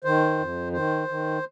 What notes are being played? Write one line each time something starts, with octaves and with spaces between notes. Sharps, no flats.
D#3 C5
F2
D#3 C5
D#3